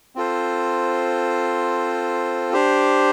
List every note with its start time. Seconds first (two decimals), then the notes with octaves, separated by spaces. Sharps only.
0.15 C4 F4 A4 C5
2.53 D4 G4 C5